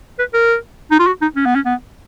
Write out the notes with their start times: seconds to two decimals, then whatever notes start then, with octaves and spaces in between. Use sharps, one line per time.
0.19 B4
0.34 A#4
0.91 D#4
0.99 F4
1.07 F#4
1.22 D#4
1.36 C#4
1.46 B3
1.55 C#4
1.65 B3